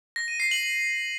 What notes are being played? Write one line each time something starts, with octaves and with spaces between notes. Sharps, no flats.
A#6
D#7
C7
F#7
F#7